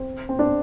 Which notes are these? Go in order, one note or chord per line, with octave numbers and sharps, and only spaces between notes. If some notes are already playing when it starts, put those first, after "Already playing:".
Already playing: C4
C4
D4